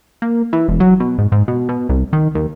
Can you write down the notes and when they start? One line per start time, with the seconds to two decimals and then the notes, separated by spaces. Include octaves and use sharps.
0.22 A#3
0.53 E3
0.68 E1
0.80 F#3
1.00 B2
1.18 G#2
1.32 G#2
1.48 B2
1.69 B2
1.89 C2
2.13 D#3
2.35 D#2